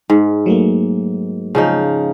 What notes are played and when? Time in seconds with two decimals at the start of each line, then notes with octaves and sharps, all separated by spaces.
0.10 G#2
0.46 F#3 A3 A#3
1.55 C#3 F3 D#4